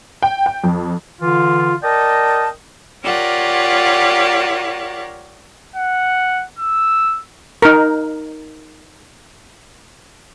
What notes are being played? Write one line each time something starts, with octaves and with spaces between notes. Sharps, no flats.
G5
G5
F2
D3 E3 F4
A#4 D5 D#5 G5 A5
F4 G4 A#4 C#5 D5 F#5
F#5
E6
D#4 A#4